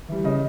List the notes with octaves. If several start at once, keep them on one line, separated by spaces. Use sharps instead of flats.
E3 G3
C#3 D#5